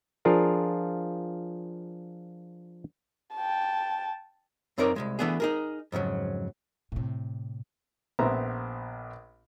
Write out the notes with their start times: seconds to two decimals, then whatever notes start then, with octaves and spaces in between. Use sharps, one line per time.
0.25 F3 D4 F4 G#4 A#4 F5
3.36 G5 A5
4.78 F#2 C4 D#4 A#4 C#5 D5
4.96 C2 F#2 G#3
5.19 E3 A3 B3 D4 G#4
5.40 D#4 G#4 A#4
5.92 F2 G#2 C#3 F#3
6.92 A2 C3
8.19 A#1 B3 C4 E5 A#5